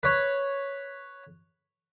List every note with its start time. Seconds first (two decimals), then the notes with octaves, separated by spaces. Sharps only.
0.03 B4 C#5